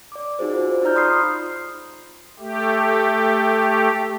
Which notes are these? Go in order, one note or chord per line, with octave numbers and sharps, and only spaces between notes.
D5 D6
D#4 F#4 G#4 C5
F4 C5
D#4 F4 D5 A#5 F6 G6
B5 C6 D#6 F6 G6 C7
A3 G4